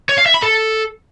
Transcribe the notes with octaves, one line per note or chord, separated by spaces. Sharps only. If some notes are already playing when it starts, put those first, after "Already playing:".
C#5
F5
E5
B5
A4